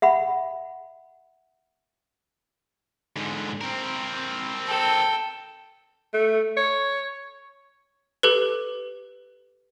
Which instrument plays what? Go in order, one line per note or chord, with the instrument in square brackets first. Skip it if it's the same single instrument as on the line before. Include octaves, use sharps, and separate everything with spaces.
[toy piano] E5 F#5 B5
[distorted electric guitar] G#2 D3
C4 A#4
[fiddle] A4 G5
[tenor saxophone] A3
C#5
[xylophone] G4 A4 B4